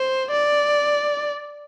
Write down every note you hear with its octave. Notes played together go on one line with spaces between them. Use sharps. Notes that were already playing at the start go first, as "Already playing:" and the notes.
Already playing: C5
D5